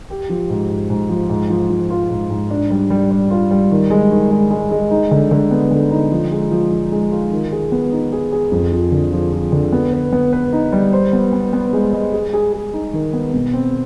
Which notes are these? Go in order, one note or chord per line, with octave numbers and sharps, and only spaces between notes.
G4
F3
G#2
G#2
G#2
F3
G#2
F3
F3
F4
G#2
G#2
D4
G3
G3
G3
F4
G3
D#3
G#3
D#3
G#3
G#3
G#3
D#4
D3
D3
B3
D3
D#4
F3
G#3
F3
F3
G#3
F4
D#3
G#4
B3
D#4
G#4
G#4
F2
F3
D3
F3
F3
D3
B3
B4
B3
B4
D#4
G3
C5
B3
B3
B3
G#3
G#3
G#4
G#4
G#4
D#4
D#3
B3
B2
C4